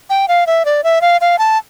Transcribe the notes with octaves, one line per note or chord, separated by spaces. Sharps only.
G5
F5
E5
D5
E5
F5
F5
A5